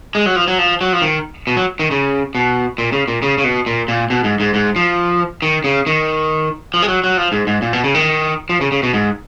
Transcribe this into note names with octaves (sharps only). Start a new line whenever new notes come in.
G#3
F#3
F3
F#3
F3
F#3
F3
D#3
B2
F#3
D#3
C#3
B2
A#2
C#3
A#2
C#3
C#3
B2
A#2
A#2
B2
G#2
G#2
G#2
F3
D#3
C#3
D#3
F3
G#3
F#3
F#3
F3
G#2
G#2
A#2
B2
C#3
D#3
F3
C#3
C#3
B2
G#2